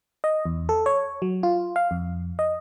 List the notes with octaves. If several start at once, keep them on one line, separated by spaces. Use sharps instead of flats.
D#5
E2
A4
C#5
F#3
F4
F5
F2
D#5